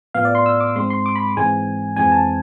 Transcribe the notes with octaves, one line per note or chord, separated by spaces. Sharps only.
A2 F3 B3 F5
D5
C6
E6
D6
G#2 G#3 C4 C6
C6
D6
B5
G#2 E3 G#3 C4 G#5
F2 E3 G#3 C4 G#5
A5